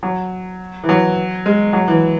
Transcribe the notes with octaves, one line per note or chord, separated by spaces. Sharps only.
F#3
E3
F#3
G#3
F#3
E3